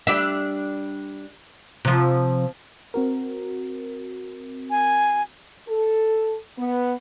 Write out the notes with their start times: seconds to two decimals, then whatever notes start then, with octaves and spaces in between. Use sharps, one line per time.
0.07 G3 D4 E5
1.85 C3 F3
2.94 C4 F#4 A#4
4.71 G#5
5.68 A4
6.58 B3